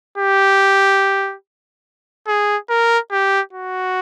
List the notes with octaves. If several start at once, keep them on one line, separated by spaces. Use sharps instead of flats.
G4
G#4
A#4
G4
F#4